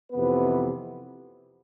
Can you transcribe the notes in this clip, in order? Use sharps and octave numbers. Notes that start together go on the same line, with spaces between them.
F2 C3 E3 B3 B4